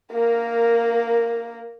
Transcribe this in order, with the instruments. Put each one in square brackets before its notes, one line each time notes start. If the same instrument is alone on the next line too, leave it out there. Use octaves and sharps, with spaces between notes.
[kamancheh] A#3 A#4